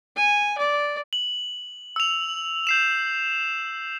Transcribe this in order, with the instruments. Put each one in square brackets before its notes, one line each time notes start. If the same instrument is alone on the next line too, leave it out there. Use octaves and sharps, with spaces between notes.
[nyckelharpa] G#5
D5
[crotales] F#7
E6 F7
G6 C7 E7